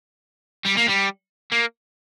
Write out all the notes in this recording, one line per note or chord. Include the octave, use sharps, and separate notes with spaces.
G3
A#3
G3
A#3